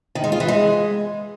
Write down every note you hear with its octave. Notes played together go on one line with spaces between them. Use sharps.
D#3
G#3
F4
E3
G#3